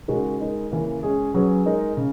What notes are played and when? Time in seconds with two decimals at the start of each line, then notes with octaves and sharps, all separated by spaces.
0.08 C#3 G#3 D#4 F#4 A#4
0.40 G#3 D#4 A#4
0.71 C#3 E3 A#3 C#4
1.03 G#3 C#4 G#4
1.34 F#3 C#4 G#4 B4
1.66 G#3 D#4 A#4
1.97 C#3